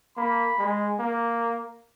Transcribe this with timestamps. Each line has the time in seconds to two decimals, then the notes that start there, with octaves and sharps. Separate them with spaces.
0.17 A#3 B5
0.59 G#3
1.00 A#3